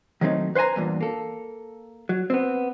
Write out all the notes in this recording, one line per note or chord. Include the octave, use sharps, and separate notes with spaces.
D#3 F#3 A3 C4 D#4
B4 C5 F#5 G#5 A#5
E2 G2 A#2
A#3 A4
F#3
B3 C4